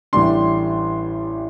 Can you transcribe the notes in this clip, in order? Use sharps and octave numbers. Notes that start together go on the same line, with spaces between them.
A1 A2 G3 D4 C6